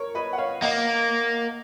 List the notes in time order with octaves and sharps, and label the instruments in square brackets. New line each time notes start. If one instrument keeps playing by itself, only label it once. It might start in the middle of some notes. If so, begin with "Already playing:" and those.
Already playing: [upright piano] A#4 C#5
B4 D#5
F#5
C#5 F5
[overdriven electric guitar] A#3 [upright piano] D#5 F#5